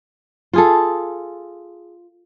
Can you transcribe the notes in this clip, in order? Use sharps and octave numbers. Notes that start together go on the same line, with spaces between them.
F4 G#4 A4